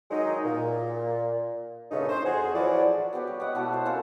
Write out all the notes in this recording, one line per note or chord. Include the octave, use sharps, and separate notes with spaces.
D#3 F#3 G#3 D#4
A#2
G2 A#2 C#3 A3 C#4 D#4
C5
F2 F#4 G#4
A2 E3 F3 F#4 D5
B3 F#4 G4 C#5
G3
G4 D#5 F#5
B2 E4 F#4 A4
C5 C6
C#4 F4 A4 A#4